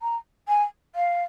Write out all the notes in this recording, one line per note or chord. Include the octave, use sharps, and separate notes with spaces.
A#5
G#5
F5